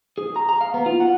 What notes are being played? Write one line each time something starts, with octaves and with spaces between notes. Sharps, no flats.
G#4
A#5
A#5
F5
B3
F4
F#5